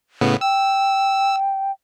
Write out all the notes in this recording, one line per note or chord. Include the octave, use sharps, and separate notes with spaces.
A2 C#3 B3
G5 E6